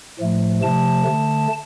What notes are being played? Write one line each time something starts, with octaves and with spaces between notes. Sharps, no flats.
A2 F3 A3
C3 F3 A3 A5
D3 A3